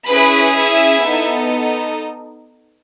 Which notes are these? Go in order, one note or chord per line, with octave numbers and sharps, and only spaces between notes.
C#4 E4 G#4 B4 B5
E4 E5
B3 D#4 A4